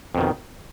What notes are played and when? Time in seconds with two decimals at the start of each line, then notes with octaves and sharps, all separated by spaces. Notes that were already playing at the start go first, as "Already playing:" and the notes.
0.15 F2
0.18 B2
0.21 D#3